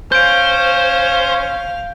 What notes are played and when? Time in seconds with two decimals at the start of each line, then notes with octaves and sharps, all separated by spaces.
0.12 C#4 C5 F5 G6 D7